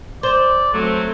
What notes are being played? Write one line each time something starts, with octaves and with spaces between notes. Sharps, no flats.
C5 D5
F#3 A3 C4